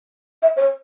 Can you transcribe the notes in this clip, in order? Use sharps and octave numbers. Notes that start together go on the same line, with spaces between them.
E5
C#5